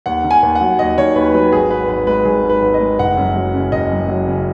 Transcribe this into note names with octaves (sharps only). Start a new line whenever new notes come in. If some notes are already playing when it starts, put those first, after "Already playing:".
D#2 F#5
D#3
G#5
D#2
F#5
F#3
D#2 D#5
D#3 C#5
D#2 B4
F#3 B4
G#1 G#4
G#2 B4
G#1 B4
G#3 B4
G#1 G#4
G#2
B4
G#1
D#5
G#3
F#1 F#5
F#2
F#3
C#3
F#1 D#5
F#2
F#3
C#3